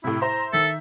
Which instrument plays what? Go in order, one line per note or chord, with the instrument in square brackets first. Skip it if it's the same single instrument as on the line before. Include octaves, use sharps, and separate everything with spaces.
[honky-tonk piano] A2 C3 [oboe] E4
[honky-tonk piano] E4 C5 [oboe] A#5
[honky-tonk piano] D#3 [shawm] A4 [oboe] E5